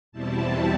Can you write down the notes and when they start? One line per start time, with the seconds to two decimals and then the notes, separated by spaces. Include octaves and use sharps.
0.12 E2 B2 G3 C4 E4 A5